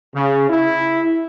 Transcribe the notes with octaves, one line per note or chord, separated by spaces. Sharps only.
C#3
E4